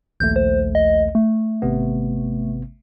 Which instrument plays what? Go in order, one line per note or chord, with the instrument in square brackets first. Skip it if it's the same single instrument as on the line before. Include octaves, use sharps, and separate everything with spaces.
[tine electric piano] A#1 D#2 A3 [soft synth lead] G6
[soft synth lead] C5
D#5
A3
[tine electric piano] G#1 C3 B3